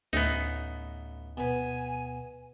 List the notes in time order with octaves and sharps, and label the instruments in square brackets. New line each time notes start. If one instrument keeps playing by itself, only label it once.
[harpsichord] A1 C#4 E5 [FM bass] D2 [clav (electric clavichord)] B3 D#4
[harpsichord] B2 B4 [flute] G#5